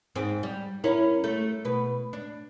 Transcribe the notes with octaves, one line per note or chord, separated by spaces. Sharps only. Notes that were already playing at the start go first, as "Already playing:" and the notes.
G#2 C4
G3
C#4 E4 A#4
A3
B2 B4
D4